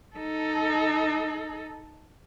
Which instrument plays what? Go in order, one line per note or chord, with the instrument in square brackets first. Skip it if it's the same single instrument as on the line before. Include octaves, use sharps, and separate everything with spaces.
[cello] D#4 A4